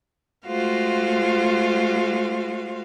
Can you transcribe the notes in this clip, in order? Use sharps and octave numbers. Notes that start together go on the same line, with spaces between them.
G#3 A3 F4 F#4 C5 F5